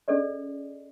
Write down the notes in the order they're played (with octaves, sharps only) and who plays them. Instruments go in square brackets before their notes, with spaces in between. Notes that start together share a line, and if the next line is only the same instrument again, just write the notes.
[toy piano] C#4 G#4 A4 D5 D#5